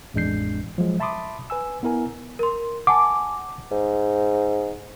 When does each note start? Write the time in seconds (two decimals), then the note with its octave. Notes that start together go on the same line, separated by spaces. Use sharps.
0.14 A1 F2 G#3 D4 G6 C7
0.78 F3 F#3 G#3
1.00 E5 A5 B5 C6 D6 D#6
1.50 B4 G#5 E6
1.83 B3 E4 A#4 G#5
2.39 A#4 C6
2.87 F#5 G#5 A5 D6
3.71 G#2